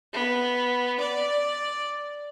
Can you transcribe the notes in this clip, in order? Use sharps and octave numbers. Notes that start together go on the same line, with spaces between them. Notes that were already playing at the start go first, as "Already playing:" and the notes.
B3
D5